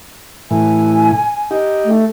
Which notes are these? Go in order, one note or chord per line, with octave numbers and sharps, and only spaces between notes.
A2 E3 G#5
D#4 G4
A3